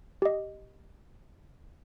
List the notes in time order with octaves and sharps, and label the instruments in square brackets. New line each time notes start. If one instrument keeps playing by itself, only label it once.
[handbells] G4 D#5